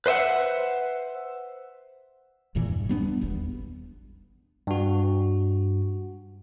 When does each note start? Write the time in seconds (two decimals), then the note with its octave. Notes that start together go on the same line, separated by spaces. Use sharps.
0.06 B4 C5 D#5 E5 F#5
2.55 F1 E2 A#2 E3
2.68 G2
2.89 G3 B3 D4
3.21 D#1 G#1 E2
4.67 G2 F#4